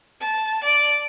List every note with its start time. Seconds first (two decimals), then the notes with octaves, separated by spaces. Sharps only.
0.21 A5
0.64 D5